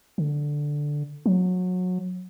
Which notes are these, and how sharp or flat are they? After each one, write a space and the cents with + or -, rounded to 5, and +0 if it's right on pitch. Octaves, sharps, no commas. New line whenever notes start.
D3 +0
F#3 -25